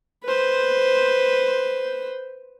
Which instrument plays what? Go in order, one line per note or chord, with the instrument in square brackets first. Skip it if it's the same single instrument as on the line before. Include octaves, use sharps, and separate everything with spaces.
[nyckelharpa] B4 C5